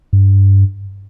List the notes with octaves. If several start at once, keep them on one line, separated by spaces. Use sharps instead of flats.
G2